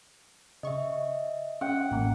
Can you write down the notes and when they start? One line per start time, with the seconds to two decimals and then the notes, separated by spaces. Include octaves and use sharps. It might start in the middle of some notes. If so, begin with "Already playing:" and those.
0.63 C#3 D#5 E5 C#6
1.61 C#4 F#5 G5
1.91 A1 A#3